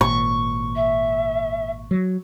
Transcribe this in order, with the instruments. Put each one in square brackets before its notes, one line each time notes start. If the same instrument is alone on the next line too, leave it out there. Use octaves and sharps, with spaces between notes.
[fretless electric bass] G#1 A#2 [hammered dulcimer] C#6
[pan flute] E5
[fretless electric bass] F#3